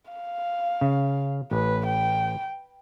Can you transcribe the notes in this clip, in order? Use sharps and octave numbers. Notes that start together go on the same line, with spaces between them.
F5
C#3
A1 B4
G5